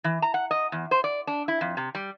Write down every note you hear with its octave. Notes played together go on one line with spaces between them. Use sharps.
E3
A#5
F#5
D#5
E2
C5
D5
D4
E4
F2
C3
G3